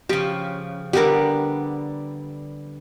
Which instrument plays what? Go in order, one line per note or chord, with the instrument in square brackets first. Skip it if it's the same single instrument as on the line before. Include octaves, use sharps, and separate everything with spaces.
[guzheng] C#3 F3 [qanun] G4
[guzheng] D3 G3 B3 [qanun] G4 A#4